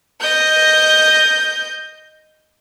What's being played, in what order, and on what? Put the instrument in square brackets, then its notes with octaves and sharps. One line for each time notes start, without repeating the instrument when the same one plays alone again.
[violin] D#5 G6